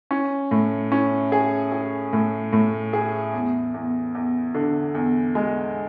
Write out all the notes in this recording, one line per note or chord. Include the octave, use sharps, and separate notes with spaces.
C#4
A2
C#4
G#4
G#4
A2
A2
G#4
E2
E2
E2
D3
E2
G#3